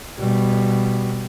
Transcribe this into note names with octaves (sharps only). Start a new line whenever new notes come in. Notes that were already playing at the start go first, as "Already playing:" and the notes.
B2 G3